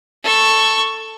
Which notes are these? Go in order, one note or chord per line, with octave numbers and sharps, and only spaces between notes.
A4 C#6